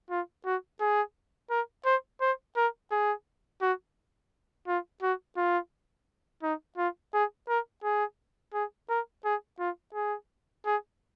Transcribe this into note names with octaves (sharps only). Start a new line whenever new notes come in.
F4
F#4
G#4
A#4
C5
C5
A#4
G#4
F#4
F4
F#4
F4
D#4
F4
G#4
A#4
G#4
G#4
A#4
G#4
F4
G#4
G#4